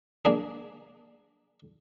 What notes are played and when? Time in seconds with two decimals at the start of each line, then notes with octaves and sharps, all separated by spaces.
0.25 A#3 D4 G#4